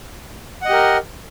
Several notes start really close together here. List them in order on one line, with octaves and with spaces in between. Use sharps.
F#5 D#5 G4 A#4